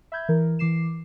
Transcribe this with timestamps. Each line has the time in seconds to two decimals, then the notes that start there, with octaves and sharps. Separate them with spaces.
0.12 E5 B5 G6 G#6
0.29 E3 A#4
0.59 E3 D6 C7 E7